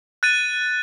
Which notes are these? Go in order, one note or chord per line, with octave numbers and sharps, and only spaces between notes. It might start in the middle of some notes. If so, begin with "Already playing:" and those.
F#6 A6 D#7